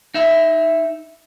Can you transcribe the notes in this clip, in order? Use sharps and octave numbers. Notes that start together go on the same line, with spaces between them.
D#4 E5